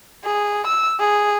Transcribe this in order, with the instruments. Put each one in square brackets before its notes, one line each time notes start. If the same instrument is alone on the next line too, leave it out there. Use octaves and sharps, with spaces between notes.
[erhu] G#4
E6
G#4